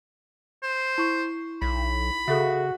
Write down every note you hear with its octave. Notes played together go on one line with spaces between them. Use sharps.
C5
E4 C#6
B1 B5
C#3 F#4 G#4 A4 E5